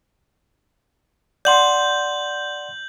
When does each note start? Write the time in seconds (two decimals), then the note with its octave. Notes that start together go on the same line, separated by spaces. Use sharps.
1.45 D5 F#5 C6 G6 F#7